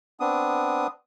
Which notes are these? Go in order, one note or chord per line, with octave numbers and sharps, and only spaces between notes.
B3 C4 D4 D#6